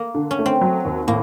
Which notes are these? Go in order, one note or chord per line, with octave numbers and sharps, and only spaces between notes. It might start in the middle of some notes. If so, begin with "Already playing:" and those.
Already playing: A#3
D3
C#4
A3
C4
F#3
D#2
A2 A#3